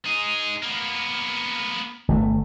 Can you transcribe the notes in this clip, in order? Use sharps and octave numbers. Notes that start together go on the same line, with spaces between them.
D#4 G#4
A#3 B3
G1 A#2 A3